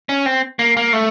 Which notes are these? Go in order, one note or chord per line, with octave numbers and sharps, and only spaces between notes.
C#4
C4
A#3
A#3
A3